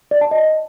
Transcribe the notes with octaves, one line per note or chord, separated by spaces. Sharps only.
D5
A5
D#5